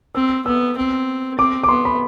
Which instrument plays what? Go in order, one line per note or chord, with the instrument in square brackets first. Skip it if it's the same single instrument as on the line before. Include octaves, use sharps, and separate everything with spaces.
[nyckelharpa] C4 [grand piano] E6
[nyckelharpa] B3 [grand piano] E6
[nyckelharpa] C4
[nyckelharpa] C4 [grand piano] D6
[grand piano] D6
[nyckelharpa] B3 [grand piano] C6
[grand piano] B5